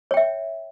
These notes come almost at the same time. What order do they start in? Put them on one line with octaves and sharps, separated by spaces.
C#5 G5 E5